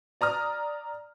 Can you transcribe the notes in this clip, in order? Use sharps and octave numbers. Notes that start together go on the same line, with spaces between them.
D5 A#5 D#6 F6